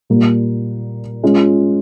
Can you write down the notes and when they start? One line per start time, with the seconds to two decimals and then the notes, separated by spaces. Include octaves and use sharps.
0.10 A#2 G3 A#3
1.23 G#3 C#4 F4